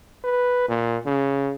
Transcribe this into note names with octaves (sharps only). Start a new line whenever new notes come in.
B4
A#2
C#3